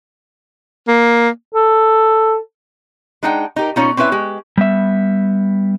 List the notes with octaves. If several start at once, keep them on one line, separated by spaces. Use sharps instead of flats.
A#3
A4
G#3 D4 D#4 F#5 G5
D#4 G4 A#4
B2 C#4 D#4 F4
C4 C#4 E4 B4 E5
G#3 G4
G3 B3 E5